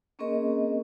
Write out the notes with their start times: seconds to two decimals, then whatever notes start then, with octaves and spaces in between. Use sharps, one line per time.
0.19 A#3 C4 C#4 G#4 A#4 D#5